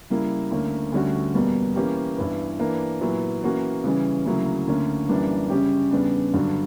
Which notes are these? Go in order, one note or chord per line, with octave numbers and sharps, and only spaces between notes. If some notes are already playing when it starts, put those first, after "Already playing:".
C#3 G3 A#3 E4
D2 D3 A#3 C#4
D2 D3 G3 C#4 F#4
E2 B2 G3 A#3
E3 A#3 C#4 G4
G2 E3 B3 E4
E3 A#3 D4
A#2 F#3 B3 E4
E3 A#3 C#4 F#4
C#3 E3 G3 C#4
D2 C#3 F#3 A#3 E4
D2 D3 A#3 C#4
F#2 E3 G3 A#3 D4
F#2 C#3 G3 C#4 G4
E2 C#3 G3 B3 D4
G2 D3 F#3